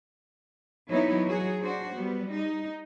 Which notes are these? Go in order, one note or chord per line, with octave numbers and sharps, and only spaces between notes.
E3 F#3 B3 D#4 E4 C#5
F#3 F#4 G#4
D4 F#4 C5
G3 B3
D#4